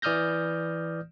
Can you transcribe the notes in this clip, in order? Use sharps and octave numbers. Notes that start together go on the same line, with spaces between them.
E3 D5 D#6 F6 G6 A#6